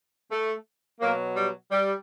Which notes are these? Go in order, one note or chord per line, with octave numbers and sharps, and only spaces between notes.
A3
B2 F#3 A#3
G3
G3